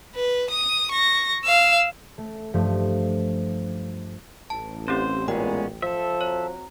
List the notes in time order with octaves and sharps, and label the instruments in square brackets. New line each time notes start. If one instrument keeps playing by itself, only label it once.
[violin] B4
D#6
C#6 A#6
F5 E6
[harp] A3
G2 F3 A3
[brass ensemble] A1 [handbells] A5
[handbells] C4 C#4 G4 [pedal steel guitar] C5
[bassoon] A#2 [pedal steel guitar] G#3 B3 C#4 [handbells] G5
[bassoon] F3 [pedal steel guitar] A4 E5
[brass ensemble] C4 F#4 A#5 [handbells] C#5